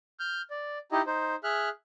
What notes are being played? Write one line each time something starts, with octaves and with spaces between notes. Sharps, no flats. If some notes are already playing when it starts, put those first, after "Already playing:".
F6 G6
D5
D#4 E4 G4 D#5
D#4 C5
G#4 E5 F6 F#6